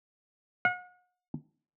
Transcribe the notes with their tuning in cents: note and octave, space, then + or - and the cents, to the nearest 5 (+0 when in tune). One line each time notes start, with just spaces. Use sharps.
F#5 -40